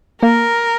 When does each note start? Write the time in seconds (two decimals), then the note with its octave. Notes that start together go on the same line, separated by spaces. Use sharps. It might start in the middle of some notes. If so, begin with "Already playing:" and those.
0.21 A#3 A#4